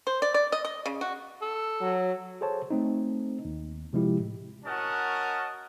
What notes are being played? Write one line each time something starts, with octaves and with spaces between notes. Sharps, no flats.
C5
D5
D5
D#5
D#5
C#3
F#4
A4
F#3
G#4 A4 C5 C#5 A5
A3 C4 D#4
D#2
C3 F3 G#3 E4 G4
A2
C#4 F#4 A#4 D#5 F#5 A5